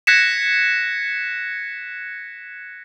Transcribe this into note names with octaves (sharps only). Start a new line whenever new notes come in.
F#6 G#6 A#6 B6 C#7 E7